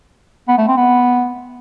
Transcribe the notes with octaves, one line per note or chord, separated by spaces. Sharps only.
B3
A3
C4
B3